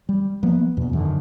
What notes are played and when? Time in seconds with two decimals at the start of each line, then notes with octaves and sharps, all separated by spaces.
0.09 G3
0.43 F3 A#3 B3
0.77 E2 B2
0.93 F#2 D3 D#3